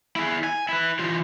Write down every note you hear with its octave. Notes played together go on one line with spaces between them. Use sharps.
E4 G#4
G#5
E4 B4
E3 F4